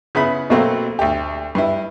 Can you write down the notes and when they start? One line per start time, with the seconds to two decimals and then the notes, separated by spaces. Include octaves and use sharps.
0.15 C#3 B3 E4 B5
0.50 B2 F#3 A3 A#3 C4
0.99 D2 G4
1.55 G2 E4